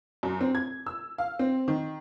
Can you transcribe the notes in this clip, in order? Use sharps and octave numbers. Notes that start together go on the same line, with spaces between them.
F#2
C4
G#6
E6
F5
C4
D#3